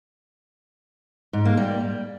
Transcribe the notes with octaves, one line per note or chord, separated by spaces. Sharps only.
G#2
A#3
G3